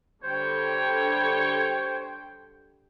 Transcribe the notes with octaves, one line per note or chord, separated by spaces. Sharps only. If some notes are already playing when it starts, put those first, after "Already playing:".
D3 G3 C5 C#5 G5